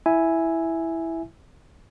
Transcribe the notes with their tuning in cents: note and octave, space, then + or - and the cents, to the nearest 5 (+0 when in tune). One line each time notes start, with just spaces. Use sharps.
E4 +0 E5 +0 G#5 +0